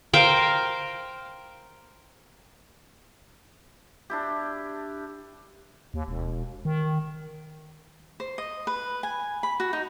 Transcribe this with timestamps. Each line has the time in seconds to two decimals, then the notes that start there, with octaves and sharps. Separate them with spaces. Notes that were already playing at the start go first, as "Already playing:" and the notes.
0.14 A#4 C5 F5 G5
4.10 D4 E4 G4
5.94 D#2
6.08 E1
6.65 D#3
8.20 C5
8.38 D#5
8.67 B4
9.03 G#5
9.43 B5
9.60 F#4
9.73 D#4